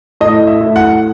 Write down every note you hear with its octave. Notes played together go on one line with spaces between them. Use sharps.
A2 D#5
E5
A2
F#5